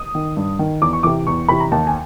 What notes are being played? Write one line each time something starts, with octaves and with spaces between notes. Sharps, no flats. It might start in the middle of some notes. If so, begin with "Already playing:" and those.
Already playing: D#6
D#3
G2
D#3
E2 D6
C#6
C3 E3 D6
E2 C#6
C3 E3 B5
A#5
D#2 A5
G#5